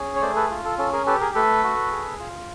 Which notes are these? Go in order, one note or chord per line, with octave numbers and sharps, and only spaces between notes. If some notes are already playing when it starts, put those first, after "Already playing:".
Already playing: C#4 G#4
C#5
A3 C5 D5
A4 B4
F4
A4
C#4 A4
G#4 A#4
G4 A4 B4
G#4 A#4
A3 A4 B4
F#4
G#4
F4